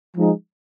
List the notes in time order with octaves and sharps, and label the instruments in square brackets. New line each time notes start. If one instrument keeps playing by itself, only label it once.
[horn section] F3 G#3 D#4